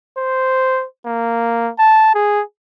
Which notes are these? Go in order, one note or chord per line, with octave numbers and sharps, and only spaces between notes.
C5
A#3
A5
G#4